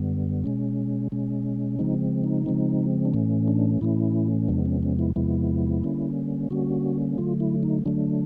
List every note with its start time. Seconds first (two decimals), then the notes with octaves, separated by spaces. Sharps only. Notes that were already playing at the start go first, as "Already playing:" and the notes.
Already playing: F#2 D3 G3 B3
0.44 B2 G#3 C#4
1.12 B2 G#3 C#4
1.79 C#3 F3 G#3 C4 D#4
2.24 D#4
2.46 C#3 F3 G#3 C4
3.05 D4
3.14 A2 E3 A3 C#4
3.48 D4
3.81 A2 E3 A3 C#4 E4
4.48 E2 C3 F3 G#3 B3 D4
4.66 C#4
4.83 C#4
4.99 E4
5.16 E2 C3 F3 G#3 B3 E4
5.83 D3 G3 A#3 C#4
6.50 D3 G3 A#3 C#4 F#4
7.18 D3 F#3 A3 F4
7.40 E4
7.63 D#4
7.85 D3 F#3 A3 D4